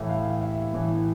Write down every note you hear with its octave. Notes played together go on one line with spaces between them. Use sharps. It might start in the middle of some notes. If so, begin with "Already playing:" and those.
Already playing: A2 E3 E5
F5
F5
E5
A2 E3